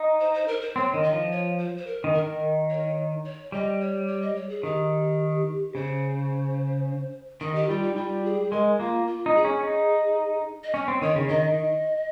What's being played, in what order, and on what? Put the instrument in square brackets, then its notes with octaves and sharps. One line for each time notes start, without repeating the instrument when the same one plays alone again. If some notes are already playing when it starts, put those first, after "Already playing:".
Already playing: [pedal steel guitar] D#4
[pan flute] C5
C5
A#4
C5
[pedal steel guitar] C4 [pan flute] C#5
[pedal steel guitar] D#3
[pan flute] D#5
[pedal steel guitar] F3
[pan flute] C#5
C5
C5
A#4
[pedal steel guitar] D#3
[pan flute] A#4
[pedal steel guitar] D#3
[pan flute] C#5
C#5
[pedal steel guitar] G3 [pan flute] D#5
[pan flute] C#5
C#5
D#5
C#5
G#4
[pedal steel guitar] D#3 [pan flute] G4
[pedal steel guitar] C#3 [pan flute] C5
[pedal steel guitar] D#3 [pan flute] D#5
[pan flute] G4
[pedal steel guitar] G3 [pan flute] F4
[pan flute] D#4
[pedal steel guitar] G3 [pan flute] F4
[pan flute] G#4
[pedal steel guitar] G#3 [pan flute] A#4
[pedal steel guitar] A#3 [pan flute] F4
[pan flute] F4
[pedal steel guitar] D#4
[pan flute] G#4
[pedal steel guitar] C#4
D#4
[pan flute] D#5
[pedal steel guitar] C#4 [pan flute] C#5
[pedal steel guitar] C4
[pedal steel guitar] D#3 [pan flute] C#5
[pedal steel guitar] C#3
[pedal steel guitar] D#3 [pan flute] D#5
[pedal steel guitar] D#3